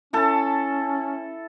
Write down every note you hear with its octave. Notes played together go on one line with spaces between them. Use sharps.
C#4 E4 A4 A5